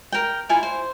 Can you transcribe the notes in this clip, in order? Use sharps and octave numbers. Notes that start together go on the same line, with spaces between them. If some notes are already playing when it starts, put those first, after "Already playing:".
A#4 G5
E4 F4 A4 G#5
C5